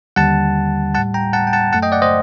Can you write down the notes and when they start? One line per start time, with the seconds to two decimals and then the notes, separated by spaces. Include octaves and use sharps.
0.16 D#2 D3 G3 F#5 A5
0.94 A2 G3 F#5 A5
1.14 G5 A#5
1.33 F#5 A5
1.47 G5
1.53 F#5 A5
1.72 F#2 F#3 A3 F#5 A5
1.83 D#5 G5
1.92 D5 F#5
2.02 C5 D#5